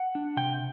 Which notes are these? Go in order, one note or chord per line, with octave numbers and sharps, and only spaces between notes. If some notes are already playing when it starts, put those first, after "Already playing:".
Already playing: F#5
D4
C3 G5